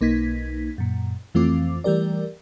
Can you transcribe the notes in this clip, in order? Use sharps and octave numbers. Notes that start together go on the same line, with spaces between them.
B1 A#3 D#4 G#6 B6
F#2 A#2
F2 E3 A3 C4 F4 D6
E3 G3 A3 G4 A#4 D5